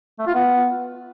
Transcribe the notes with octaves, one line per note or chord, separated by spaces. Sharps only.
A3
F4
B3